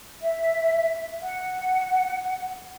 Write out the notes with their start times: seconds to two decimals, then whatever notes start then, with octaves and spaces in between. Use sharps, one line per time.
0.21 E5
1.22 F#5